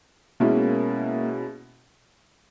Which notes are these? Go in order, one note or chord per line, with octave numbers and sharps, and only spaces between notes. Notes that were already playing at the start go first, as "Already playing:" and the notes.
B2 G#3 A#3 C#4 E4